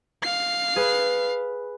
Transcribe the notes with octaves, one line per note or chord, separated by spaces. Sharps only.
F5 C7
G#4 B4 B5